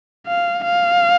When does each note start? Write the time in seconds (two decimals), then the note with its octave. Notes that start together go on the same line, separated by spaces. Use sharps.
0.27 F5
0.64 F5